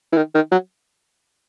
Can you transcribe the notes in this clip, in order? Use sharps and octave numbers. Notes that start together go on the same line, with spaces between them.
E3
D#3
D#3
F#3